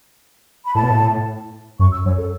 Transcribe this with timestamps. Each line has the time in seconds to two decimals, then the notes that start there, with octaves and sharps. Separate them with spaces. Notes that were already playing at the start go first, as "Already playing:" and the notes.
0.65 B5
0.75 A2 A5
0.83 B2
0.90 A2
1.79 F#2 C#6
1.92 E6
2.05 F#2 C#5
2.18 A4